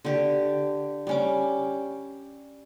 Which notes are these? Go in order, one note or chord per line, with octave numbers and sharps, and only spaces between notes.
D3 G4
G3 C#4 D6